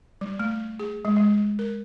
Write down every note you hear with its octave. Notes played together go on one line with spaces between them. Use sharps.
G3
A3
G#4
G#3
G#3
A#4